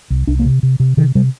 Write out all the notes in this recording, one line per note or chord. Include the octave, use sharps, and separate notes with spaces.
C2
C2 D4
A#3
C3
C3
C3
C3 D#3
C3 G3